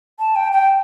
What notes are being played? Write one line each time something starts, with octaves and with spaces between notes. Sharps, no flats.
A5
G5
G5